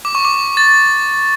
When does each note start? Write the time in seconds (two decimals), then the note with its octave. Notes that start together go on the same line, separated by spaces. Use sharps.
0.05 D6
0.15 C#6
0.25 D6
0.57 A6